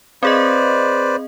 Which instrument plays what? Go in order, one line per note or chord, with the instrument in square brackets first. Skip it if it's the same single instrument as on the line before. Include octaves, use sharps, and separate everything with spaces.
[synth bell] C4 G#4 D#5 [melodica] B4 C5 D5